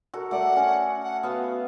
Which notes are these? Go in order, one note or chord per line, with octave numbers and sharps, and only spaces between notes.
F#4 A4 A#4
A3 D5 F#5
C#4
F#5
B3 F#4 F5